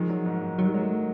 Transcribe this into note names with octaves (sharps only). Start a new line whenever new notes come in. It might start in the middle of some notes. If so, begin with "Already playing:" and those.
Already playing: D#3 F3 G#3
F#3
G#2
G#2
D#3 F#3
G3
F#3 G#3
A3